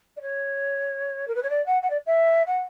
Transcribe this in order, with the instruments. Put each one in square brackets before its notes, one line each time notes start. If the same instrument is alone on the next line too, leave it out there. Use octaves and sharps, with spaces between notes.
[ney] D5
C#5
A#4
B4
C#5
D5
F#5
F#5
D5
E5
F#5